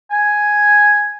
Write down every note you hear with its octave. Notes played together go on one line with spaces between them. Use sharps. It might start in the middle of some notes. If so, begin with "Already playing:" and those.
G#5